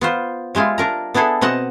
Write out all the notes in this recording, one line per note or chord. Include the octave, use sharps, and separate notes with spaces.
B3 F4 C5
G3 G#3 E4 F4
D4 A#4 A#5
B3 D4 E4 G#4 A4
B2 C4 D#5 F#5 A5